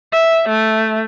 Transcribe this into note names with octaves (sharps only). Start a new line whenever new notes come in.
E5
A3